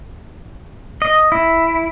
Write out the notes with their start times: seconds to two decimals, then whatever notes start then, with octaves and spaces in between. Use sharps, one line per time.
1.02 D#5
1.32 E4